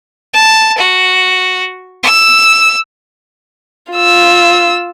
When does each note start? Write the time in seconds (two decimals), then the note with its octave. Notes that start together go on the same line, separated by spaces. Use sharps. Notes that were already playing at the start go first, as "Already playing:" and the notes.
0.33 A5
0.78 F#4
2.03 E6
3.93 F4 E6